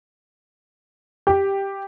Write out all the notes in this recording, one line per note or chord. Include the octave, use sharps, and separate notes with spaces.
G4